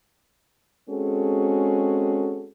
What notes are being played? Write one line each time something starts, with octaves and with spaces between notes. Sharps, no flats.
G#3 C4 C#4 F#4 G#4 A4